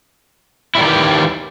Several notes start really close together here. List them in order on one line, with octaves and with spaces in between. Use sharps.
E4 G3 D#3 G4 E3